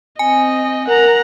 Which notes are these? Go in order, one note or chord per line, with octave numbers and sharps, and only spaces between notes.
C4 D#5 G#5
A#4 F#5 A#5